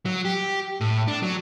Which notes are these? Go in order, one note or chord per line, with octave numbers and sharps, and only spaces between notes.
F#3
G4
A2
D4
F#3